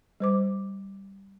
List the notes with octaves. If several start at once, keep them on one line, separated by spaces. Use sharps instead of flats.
G3 C5 D6